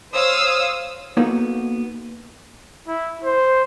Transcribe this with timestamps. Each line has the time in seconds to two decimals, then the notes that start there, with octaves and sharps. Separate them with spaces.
0.12 C5 C#5 F5 D#6 E6
1.17 A#3 B3 D#4 F#4 A4 A#4
2.88 E4
3.24 C5